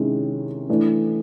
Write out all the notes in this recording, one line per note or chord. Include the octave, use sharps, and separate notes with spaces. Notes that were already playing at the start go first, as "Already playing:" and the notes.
Already playing: C3 D#3 G#3 C#4 E4
E3 A3 D4